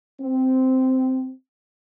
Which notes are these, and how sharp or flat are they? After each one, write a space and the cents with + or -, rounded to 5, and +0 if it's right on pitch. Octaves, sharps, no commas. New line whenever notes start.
C4 -10